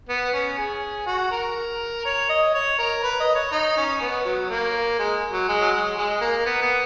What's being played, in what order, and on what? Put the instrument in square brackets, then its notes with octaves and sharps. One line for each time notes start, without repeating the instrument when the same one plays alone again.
[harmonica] B3
C#4
G#4
F#4
A#4
C#5
D#5
C#5
A#4
B4
D#5
C#5
D#4
C#4
B3
F#3
A#3
G#3
F#3
G#3
F#3
G#3
G#3
A#3
B3
B3